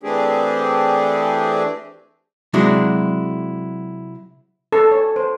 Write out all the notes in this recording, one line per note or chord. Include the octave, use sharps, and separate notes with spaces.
E3 A3 C4 D4 G4 G#4
C3 F#3 G#3 D4 E4 F#4
A4
C#5
C5